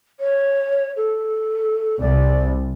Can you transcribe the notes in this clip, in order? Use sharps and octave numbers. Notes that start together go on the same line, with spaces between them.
C#5
A4
C2 D5